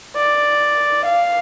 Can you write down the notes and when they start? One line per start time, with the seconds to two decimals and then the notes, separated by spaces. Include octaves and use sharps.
0.16 D5
1.05 F5